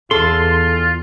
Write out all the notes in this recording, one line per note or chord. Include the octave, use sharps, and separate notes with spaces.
E2 F4 A4 C6